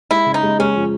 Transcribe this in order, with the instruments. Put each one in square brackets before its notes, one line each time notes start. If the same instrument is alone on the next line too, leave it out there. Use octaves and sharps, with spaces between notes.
[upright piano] G#3 [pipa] E4
[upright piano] C#3
[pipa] D#4
[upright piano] G#3
[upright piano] G#3 [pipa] C#4
[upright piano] F3